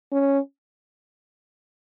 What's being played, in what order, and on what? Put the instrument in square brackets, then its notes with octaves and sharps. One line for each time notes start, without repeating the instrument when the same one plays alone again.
[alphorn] C#4